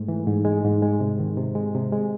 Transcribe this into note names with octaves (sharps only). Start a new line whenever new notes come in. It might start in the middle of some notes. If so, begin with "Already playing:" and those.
Already playing: G#2 G#3 A3
E3
G#2
G#3
G#2
G#3
C3
D#3
C3
G#3
C3
G#3